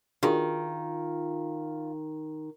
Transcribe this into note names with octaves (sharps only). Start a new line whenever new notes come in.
D#3 D4 F4 F#4 G#4